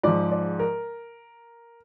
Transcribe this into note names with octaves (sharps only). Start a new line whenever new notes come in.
G#2 F3 D5
D5
A#4